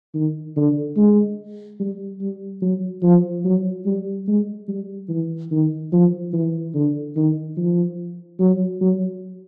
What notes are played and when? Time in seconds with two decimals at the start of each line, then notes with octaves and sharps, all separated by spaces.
0.14 D#3
0.57 D3
0.97 G#3
1.80 G3
2.21 G3
2.62 F#3
3.03 F3
3.45 F#3
3.86 G3
4.28 G#3
4.68 G3
5.09 E3
5.51 D#3
5.92 F3
6.33 E3
6.75 D3
7.16 D#3
7.57 F3
8.40 F#3
8.81 F#3